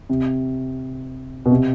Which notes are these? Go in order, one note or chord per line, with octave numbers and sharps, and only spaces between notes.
C3
B2
C3